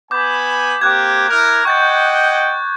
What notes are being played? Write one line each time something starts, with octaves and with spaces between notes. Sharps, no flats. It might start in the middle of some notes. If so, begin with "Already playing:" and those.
B3 G#5 B5 D6 G6
A#3 C4 G4 F#6 G#6
E4 A#4
D#5 F#5 G5 C#6 G6 A6